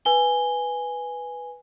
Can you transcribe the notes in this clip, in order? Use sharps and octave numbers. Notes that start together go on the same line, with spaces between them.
B4 G#5 G7